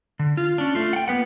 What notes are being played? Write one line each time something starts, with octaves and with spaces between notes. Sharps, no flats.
D3
F4
C#4 D4
A3 F4
F#5 G5
A#3 B3 B4 F#5